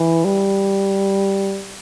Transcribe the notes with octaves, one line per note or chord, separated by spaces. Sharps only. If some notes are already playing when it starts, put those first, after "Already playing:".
Already playing: E3
G3